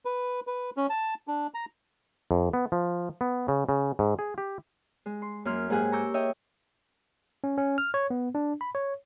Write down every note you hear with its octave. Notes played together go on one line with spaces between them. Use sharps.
B4
B4
C#4
A5
D4
A#5
F2
B3
F3
B3
C#3
C#3
G#2
G#4
G4
G#3
C6
F#2 A#3 C6 F6
G#2 A#3 G4 G#4 F#5 G#5
A#5 C#6 D6 E6 G6
C#5 D#5 E5 G5
C#4
C#4
F6
C#5
B3
D4
B5
C#5